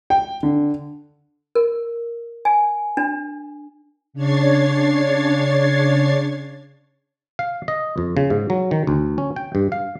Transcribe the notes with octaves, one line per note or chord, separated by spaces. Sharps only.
G5
D3
A#4
G#5
D4
C#3 D4 C#5 G#6 A6 C7
F5
D#5
F2
C#3
G#2
F#3
D#3
D2
C#4
G5
G2
F5